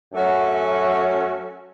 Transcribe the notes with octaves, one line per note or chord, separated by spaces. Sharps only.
F#2 F#3 A3 C#4 F#4